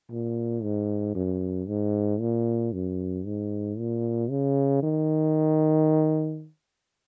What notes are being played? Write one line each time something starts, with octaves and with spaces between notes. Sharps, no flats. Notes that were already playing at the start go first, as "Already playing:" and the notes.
A#2
G#2
F#2
G#2
A#2
F#2
G#2
A#2
C#3
D#3